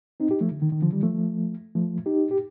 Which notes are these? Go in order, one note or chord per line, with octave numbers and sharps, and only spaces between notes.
C4 D#4
D#4 G4
F3 A3
D3
D#3
D#3
D3 F3
D#3 G3
F3 A3
F3 A3
D#4 G4
G4